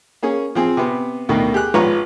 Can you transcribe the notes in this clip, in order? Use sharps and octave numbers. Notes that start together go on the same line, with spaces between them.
A#3 C#4 G#4
F3 C4 G#4
C3 B3
D2 B2 D#3
G4 G#4 F#6
G#1 F3 B4 C#5 A#5 C#6